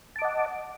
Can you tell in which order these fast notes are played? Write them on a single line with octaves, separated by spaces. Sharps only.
A5 D6 D#5 F#5